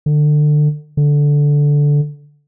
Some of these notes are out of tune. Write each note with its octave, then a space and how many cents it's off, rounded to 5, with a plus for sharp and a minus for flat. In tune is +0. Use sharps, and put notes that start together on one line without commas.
D3 +25
D3 -10